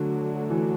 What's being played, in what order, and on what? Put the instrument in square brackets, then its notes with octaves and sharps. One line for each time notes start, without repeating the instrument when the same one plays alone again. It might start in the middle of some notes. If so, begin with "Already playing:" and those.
Already playing: [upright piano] D3 [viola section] F#3 A3 D4 F#4
[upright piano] E3